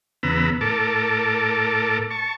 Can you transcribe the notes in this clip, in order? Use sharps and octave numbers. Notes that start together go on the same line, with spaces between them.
E2 C#3 B3 A#5 B5 E6
A2 A4 A#4 A5 D6
A5 C#6